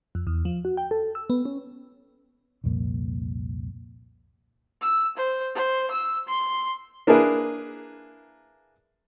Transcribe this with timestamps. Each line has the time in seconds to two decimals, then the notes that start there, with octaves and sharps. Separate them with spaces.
0.15 F2
0.27 E2
0.45 F3
0.65 F#4
0.77 G5
0.91 A4
1.15 E6
1.30 B3
1.45 C#4
2.64 C2 F2 A#2 A#3
4.81 E6
5.17 C5
5.55 C5
5.91 E6
6.27 C6
7.07 A#3 D4 E4 G#4 A#4 B4